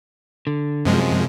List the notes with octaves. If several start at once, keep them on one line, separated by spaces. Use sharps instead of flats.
D3
F#2 C3 F3 G#3